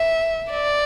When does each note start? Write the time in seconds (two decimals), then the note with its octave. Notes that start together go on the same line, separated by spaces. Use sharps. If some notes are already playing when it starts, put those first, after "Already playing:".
Already playing: E5
0.51 D5